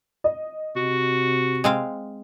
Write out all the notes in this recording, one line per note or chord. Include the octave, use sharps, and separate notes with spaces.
D#5
C3 F#4
G#3 C4 F5